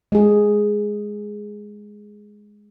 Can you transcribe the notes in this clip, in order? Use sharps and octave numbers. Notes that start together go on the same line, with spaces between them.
G#3 G#4